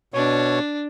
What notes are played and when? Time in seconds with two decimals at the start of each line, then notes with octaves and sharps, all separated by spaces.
0.14 B2 D4 C#5